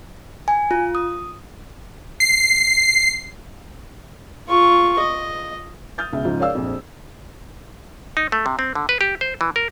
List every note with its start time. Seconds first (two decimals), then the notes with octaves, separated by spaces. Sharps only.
0.48 G#5
0.71 F4
0.95 D#6
2.20 C7
4.48 F4 C#6
5.00 D#5
5.98 D#6 F6 G6 A6
6.13 C#2 B2 E5
6.25 C#2 G#2 F3 D#4
6.39 A#4 C#5 D5 F5 E6
6.55 A#1 F2
8.17 D#4
8.32 A3
8.46 C3
8.59 C4
8.75 D3
8.89 B4
9.01 G4
9.21 C5
9.41 E3
9.56 A#4